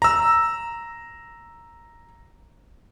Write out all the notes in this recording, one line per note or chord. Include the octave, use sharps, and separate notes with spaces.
A#5 E6